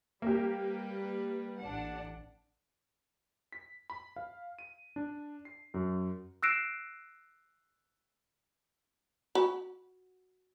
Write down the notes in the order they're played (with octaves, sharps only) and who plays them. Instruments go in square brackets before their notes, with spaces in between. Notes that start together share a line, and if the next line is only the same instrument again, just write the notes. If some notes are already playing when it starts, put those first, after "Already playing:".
[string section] G3 B4 [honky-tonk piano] A#3 G4
[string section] A1 D4 F#5
[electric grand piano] B6
B5
F5
D#7
D4
C7
F#2
[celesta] E6 F#6 A#6 C7 D7 E7
[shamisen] F#4 B5